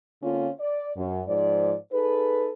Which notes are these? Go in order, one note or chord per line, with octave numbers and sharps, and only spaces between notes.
D3 A#3 C4 C#4 F4
D5
F#2
G#2 F3 C5 D5
D#4 G#4 A4 B4